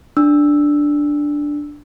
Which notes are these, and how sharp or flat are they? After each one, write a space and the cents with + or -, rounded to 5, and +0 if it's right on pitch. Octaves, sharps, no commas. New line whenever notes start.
D4 +0 E6 +0